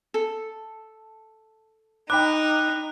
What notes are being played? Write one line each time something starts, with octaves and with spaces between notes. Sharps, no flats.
A4
D#4 G5 B5 D6 F#6